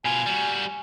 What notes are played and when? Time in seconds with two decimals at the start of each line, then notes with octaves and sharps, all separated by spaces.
0.05 B2 F4 G#5
0.26 G3 F#4